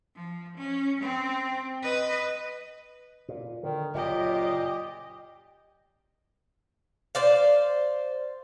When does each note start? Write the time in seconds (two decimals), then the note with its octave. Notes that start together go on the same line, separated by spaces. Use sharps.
0.16 F3
0.57 C#4
1.01 C4
1.82 B4 D#5
3.28 A#2
3.63 D3 D#3
3.94 F#1 A#2 F#3 G4 D#5
7.15 C5 D5 F5